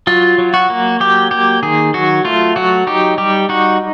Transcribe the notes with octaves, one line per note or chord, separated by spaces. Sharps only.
F#3 F4
F#3
F#4
A#3
F#3 G4
A#3 G4
D#3 G#4
F#3 F#4
A3 F4
F#3 F#4
D#4 G4
G3 G4
D#4 F#4